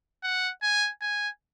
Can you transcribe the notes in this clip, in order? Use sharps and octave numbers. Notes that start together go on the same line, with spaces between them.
F#5
G#5
G#5